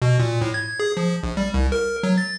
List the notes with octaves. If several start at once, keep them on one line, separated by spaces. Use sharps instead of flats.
B2
A#2
A2
G#6
G#4
F3
A#1
G3
C2
A#4
F#3
A6